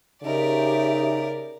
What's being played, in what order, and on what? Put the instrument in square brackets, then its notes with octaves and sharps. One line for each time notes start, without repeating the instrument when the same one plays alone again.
[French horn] C#3 [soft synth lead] D#4 [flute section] G4 E5 [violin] A#4 D5